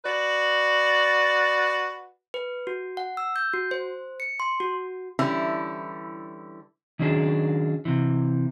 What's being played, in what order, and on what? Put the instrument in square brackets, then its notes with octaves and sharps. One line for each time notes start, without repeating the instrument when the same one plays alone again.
[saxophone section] F#4 B4 D5
[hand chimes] B4
F#4
F#5
E6
G6
F#4
C5
C#7
C6
F#4
[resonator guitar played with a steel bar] D3 E3 G3 C#4 E4
[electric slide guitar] D#3 F#3 C#4 D4 G#4
C3 E3